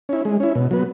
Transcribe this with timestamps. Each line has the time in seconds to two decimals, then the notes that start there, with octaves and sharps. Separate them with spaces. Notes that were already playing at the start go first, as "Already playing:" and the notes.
0.09 C#4 E4
0.25 G#3
0.40 C#4 E4
0.55 B2
0.71 F#3 B3